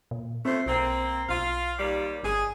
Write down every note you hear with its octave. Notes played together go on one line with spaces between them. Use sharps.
A#2
F2 A3 C4 C5
B1 A#3 C4
B1 F4 F5
D#2 G3
G1 G#4